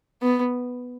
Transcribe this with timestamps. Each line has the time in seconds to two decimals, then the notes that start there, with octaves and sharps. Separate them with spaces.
0.22 B3